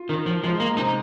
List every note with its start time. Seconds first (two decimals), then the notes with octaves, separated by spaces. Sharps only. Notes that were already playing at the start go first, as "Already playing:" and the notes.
Already playing: F4
0.09 D#3 A#4
0.26 F3
0.44 F3 G#3
0.60 A#3
0.77 C3 D#4